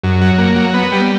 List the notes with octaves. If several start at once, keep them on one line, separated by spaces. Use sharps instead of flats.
F#2
F#3
A#3
F#3
B3
G3